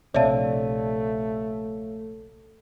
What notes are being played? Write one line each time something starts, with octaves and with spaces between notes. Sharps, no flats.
A#1 C3 A3 C#5 D5 E5 F5 A5